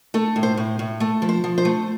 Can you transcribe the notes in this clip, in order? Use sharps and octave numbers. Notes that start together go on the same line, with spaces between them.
A3 A4
A2
C5
A2
A2
A3 A4
F3
C5
F3
C5
A3